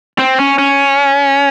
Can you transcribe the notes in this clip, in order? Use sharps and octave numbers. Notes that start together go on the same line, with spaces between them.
C4
C#4
C#4